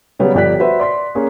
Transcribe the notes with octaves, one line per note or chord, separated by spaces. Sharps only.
C#3 F#3 G3 B3 C#4
G1 F3 G4 D5 F#6 B6
F#4 B4 C5 E5
D5 C6 B6
A#3 C#4 G#4